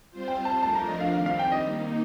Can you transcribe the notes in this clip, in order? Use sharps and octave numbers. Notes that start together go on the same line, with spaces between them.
G3 C4 F4 C5
G5
A5
F3 A3 D4 F4 A#4 A5
A#5
D#5
F5
D#3 G3 C4 G4 F5
F5
G5
D#5
D#3 A#3 D#4